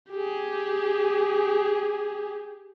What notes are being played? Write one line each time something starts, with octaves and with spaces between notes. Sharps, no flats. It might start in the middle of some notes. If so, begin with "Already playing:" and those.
G4 G#4